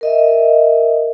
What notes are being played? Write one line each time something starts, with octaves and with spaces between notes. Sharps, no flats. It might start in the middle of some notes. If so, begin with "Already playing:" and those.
A#4 D#5 E5